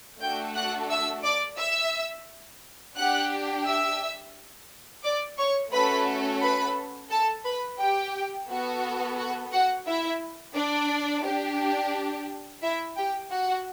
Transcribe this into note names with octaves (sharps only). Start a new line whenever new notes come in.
A3 D4 F#4 A4 G5 G6
F#5 F#6
E5 E6
D5 D6
E5 E6
D4 G4 F#5 F#6
E5 E6
D5 D6
C#5 C#6
A3 C#4 F#4 A4 B4 B5
B4 B5
A4 A5
B4 B5
G4 G5
B3 F#4 A4
F#4 F#5
F#4 F#5
E4 E5
D4 D5
D4 G4
E4 E5
G4 G5
F#4 F#5